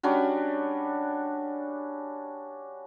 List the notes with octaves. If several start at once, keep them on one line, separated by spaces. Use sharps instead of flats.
G3 C#4 D4 F#4